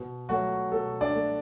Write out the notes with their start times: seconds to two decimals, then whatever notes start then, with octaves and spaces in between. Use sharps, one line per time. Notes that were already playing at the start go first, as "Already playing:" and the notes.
Already playing: B2
0.29 F#3 A3 F#4
0.72 B2 A4
1.01 D4 D5
1.15 F#3 A3